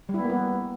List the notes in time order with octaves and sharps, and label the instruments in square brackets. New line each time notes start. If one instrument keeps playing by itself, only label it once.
[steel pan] G3
E4
B3
A#3
B3